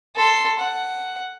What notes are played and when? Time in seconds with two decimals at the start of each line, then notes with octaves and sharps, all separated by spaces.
0.16 A4 C6
0.59 F#5